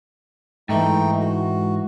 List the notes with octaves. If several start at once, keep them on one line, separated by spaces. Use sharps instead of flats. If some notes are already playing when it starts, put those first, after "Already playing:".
G#2 E3 A3 D#4 G5
F#4